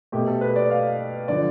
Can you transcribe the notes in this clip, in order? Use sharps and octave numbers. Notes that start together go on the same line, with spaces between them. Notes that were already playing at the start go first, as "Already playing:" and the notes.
B2 A3 G4
A4
B4
D5
F5
D3 F3 D5